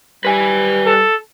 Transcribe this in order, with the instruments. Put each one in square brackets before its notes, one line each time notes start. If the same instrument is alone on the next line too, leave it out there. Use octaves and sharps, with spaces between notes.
[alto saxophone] G3 [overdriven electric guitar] B4 G#5
[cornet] A4